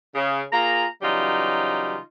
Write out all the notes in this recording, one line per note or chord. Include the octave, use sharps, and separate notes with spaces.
C#3
A#3 F4 G#4 A#5
C#3 E3 F#3 G3 D#4 F4